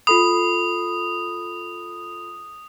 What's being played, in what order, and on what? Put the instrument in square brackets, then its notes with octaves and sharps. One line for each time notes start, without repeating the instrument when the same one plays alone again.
[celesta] F4 A4 B5 [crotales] D#6